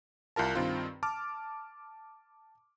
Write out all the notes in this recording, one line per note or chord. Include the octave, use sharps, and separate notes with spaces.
C2 F4 A#4 A5
G2 D#3 C4 F4
A5 D6 F6